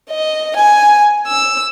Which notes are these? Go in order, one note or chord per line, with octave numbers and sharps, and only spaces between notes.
D#5
G#5
E6